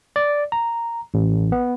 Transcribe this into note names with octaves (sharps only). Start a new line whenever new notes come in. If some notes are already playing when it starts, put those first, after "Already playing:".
D5
A#5
A1
B3